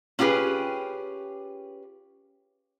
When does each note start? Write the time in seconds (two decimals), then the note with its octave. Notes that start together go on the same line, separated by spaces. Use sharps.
0.19 C#4 F4 G4 G#4 B4